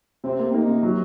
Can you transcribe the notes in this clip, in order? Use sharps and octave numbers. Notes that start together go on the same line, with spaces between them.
C3 C4
A#3
A#3 D#4
C3
F#3